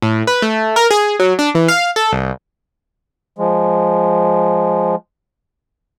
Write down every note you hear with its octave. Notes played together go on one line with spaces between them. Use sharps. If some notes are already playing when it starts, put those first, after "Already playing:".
A2
B4
A3
A#4
G#4
F#3
D4
E3
F5
A4
C2
F3 G#3